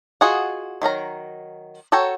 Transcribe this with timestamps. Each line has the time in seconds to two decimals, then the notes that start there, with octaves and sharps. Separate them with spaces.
0.21 F4 F#4 G#4 D#5 F#5
0.82 D#3 F#3 A#4 A#5
1.92 F#4 A4 C#5 G5 A#5